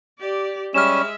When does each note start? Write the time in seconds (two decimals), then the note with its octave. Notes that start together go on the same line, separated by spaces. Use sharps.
0.19 G4 D5
0.74 G3 G#3 C#4 E5 F6 E7